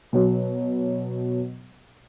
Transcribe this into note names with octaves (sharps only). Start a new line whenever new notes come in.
B2 F#3